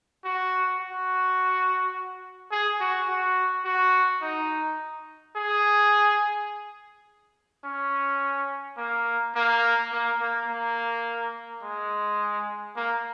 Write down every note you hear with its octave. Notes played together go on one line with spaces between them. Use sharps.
F#4
F#4
G#4
F#4
F#4
F#4
D#4
G#4
C#4
A#3
A#3
A#3
A#3
A#3
G#3
A#3